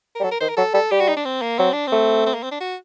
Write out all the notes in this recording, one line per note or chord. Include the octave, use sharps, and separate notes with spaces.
A#4
G3
F#3 A4
A#4
D#3 C5
A#4
F#3 A4
G3 A4
G3 G4
F#4
D#4
D4
C4
A#3
F#3 C4
D4
C4
A3
C4
A#3
C4
D4
F#4